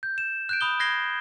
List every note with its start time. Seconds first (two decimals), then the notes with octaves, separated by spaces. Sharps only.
0.03 G6
0.18 E7
0.49 F#6 G6 D7
0.61 B5 D#6 G7
0.80 F#6 G#6 A#6 C7 G7